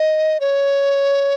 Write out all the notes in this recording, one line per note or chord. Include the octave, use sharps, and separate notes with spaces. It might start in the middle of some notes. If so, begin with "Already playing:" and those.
Already playing: D#5
C#5